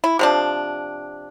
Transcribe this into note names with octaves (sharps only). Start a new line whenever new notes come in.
E4
C3 F3 D4